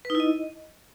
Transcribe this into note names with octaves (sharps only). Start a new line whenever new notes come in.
B4
D#4
E4
D#5